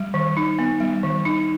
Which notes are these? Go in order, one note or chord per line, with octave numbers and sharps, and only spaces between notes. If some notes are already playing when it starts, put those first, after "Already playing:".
Already playing: G3
D#3
D#4
B3
G3
D#3
D#4